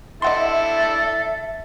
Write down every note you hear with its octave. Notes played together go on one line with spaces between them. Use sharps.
D4 E4 A4 D#5 E5 F#5 C6